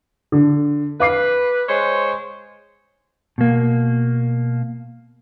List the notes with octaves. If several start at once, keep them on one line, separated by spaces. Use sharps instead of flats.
D3
B4 F5 D6 C7
G#3 C5 C#5
B2 A#3